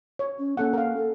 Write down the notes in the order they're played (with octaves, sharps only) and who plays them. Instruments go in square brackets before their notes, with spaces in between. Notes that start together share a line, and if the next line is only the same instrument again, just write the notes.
[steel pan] C#5
[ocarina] C#4
[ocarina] A#3 [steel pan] C#4 A4 F#5
[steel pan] A#4 F5
[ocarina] A4